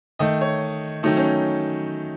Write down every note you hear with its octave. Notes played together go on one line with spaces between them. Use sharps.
D#3 A3 D#5
C#5
D#3 F#3 A3 D#4
C#4